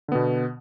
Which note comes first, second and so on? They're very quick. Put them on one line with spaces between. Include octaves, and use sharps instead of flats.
D3 B3 B2